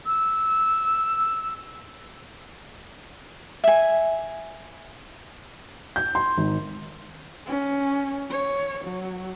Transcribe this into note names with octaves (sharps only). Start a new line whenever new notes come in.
E6
E5 G#5
G6
C6
G#1
C#4
C#5
F#3